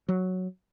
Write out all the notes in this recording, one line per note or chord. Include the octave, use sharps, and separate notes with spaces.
F#3